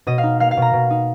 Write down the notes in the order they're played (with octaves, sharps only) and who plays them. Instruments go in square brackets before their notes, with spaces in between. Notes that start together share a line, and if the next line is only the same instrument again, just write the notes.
[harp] B2 D#5
F5
D#4
A#3 F5
F5
B2
A#5
B2
D#4